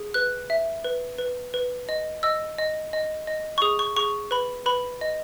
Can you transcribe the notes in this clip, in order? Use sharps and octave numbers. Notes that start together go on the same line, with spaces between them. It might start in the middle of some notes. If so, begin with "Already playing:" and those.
Already playing: G#4
B4 F#6
E5
B4
B4
B4
D#5
D#5 E6
D#5
D#5
D#5
C#6
G#4 D#6
C#6
G#4 C#6
B4 B5
B4 B5
D#5